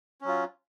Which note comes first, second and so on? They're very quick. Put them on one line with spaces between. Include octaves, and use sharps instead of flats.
C#4 F#3 F4